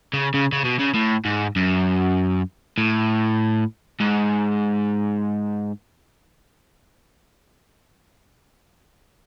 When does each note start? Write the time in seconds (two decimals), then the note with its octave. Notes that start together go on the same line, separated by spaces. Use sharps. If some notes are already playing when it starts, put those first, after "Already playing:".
0.13 C#3
0.34 C#3
0.53 C#3
0.65 B2
0.79 C#3
0.94 A2
1.25 G#2
1.56 F#2
2.78 A2
4.00 G#2